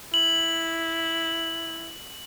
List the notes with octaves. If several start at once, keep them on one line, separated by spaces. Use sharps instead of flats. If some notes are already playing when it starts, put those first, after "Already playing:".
E4 F#7